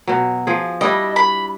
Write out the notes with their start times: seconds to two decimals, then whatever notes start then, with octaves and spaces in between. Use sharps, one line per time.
0.07 B2 F#3
0.47 F3 G#4
0.81 G3 D4 E4 D#5
1.16 B5